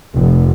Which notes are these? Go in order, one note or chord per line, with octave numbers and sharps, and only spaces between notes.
F1